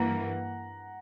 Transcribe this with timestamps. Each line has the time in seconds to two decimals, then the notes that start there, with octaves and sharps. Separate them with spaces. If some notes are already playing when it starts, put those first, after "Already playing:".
Already playing: G2 E3 A#3 F#5 A#5